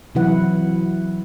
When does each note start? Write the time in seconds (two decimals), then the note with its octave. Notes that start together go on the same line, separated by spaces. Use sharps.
0.15 C3 E3 F#3 E4 B4 F#5